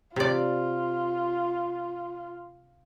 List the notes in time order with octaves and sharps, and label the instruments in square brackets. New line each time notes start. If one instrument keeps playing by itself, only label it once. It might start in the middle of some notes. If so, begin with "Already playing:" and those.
[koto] C3 D5 [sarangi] F4